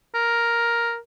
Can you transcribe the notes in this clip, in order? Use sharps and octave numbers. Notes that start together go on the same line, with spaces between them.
A#4